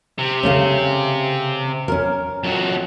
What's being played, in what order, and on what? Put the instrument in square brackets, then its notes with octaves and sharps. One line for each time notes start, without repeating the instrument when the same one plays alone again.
[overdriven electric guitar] C3
[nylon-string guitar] C#3 A3 C#4
C#4 A#4
[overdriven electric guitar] F2 F#3